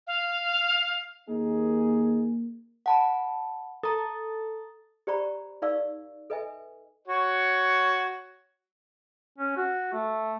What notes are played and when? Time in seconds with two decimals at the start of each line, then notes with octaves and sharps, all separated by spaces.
0.07 F5
1.29 D#2 A#3 D#4 G#4
2.86 F#5 A5 B5
3.83 A4 A#5 D#6
5.07 G4 C5 D5 A#5 B5 C#6
5.62 D#4 A#4 D5 F5 C#6 E6
6.30 A4 B4 D#5 E5 G#5
7.08 F#4 C#5
9.38 C#4
9.57 F#4
9.93 A3